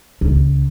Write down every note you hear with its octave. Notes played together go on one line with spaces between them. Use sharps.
C#2